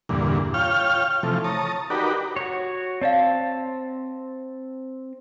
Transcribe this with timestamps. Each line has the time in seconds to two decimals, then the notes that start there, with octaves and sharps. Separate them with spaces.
0.09 E2 G2 A#2 D3
0.54 F4 C#5 F5 G5 F6
1.23 C3 E3 F3 A3
1.44 C#5 A5 A#5 D#6
1.90 D#4 F#4 G4 A#4 B4 D5
2.36 F#4 C#5
3.01 C4 C#5 D5 F5 A5